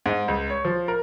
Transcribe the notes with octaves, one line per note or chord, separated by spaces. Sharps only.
G#2
C#2
C#5
F3
A#4